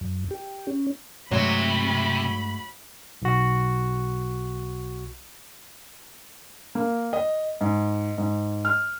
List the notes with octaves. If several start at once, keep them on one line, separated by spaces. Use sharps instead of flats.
F#2
G4
C#4
G2 C3 F#3 G#3 A3 B5
B1 F#4
A#3
D#5
G#2
G#2
F6